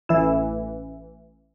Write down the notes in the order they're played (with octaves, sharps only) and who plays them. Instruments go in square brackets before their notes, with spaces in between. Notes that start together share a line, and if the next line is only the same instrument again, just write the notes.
[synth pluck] A1 E3 E4